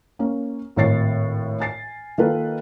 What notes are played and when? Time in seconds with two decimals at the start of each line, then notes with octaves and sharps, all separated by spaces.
0.19 A#3 C#4
0.76 G#1 A2 C#5 A6 C7
1.60 G#5 A6 C7
2.18 D#3 A#3 F4 A4 B4